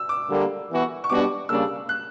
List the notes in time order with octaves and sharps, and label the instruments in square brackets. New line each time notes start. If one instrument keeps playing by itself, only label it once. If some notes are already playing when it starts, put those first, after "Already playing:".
Already playing: [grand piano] E6
D6
[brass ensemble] D3 G3 A#3
E3 B3 F#4
[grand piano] C#6
[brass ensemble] B2 G3 B3 D4 F#4 [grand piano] D6
[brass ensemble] C#3 G3 A#3 D4 [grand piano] E6
[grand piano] F#6